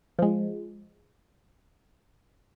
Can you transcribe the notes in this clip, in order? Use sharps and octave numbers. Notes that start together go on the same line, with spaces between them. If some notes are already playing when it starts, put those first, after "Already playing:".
F3 G#3